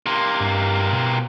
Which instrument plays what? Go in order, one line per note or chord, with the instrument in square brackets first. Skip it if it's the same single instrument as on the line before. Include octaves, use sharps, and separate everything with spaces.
[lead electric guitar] C3 A#3 [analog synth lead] C6
[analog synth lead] G2
B2